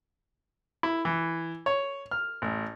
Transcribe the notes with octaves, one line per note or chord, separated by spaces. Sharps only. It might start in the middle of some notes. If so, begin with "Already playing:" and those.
E4
E3
C#5
F6
A1